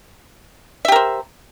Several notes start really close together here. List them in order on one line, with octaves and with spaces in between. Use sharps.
E5 G4 A#4 C5